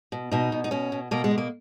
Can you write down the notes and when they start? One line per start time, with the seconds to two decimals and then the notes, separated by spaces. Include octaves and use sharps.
0.12 B2
0.31 B2 D#4
0.52 B2
0.64 D#4
0.71 B2 C#4
0.92 B2
1.11 B2 A#3
1.24 G#3
1.31 B2
1.38 A#3